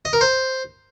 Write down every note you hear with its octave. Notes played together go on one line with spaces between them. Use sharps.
D#5
A#4
C5